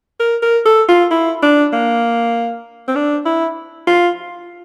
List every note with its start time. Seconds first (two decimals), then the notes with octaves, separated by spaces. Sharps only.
0.20 A#4
0.43 A#4
0.66 A4
0.89 F4
1.11 E4
1.43 D4
1.73 A#3
2.88 C4
2.96 D4
3.26 E4
3.87 F4